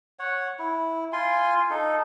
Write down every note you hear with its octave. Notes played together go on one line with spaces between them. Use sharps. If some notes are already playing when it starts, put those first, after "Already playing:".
C#5 F#5
E4
F4 G#5 C6
D#4 A4